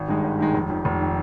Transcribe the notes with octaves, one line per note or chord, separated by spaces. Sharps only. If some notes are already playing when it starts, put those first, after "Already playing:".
Already playing: G#1
G2 D#3 G#3 D#4
G#1
G2 D#3 G#3 D#4
F1
F2 D#3
F1
D#3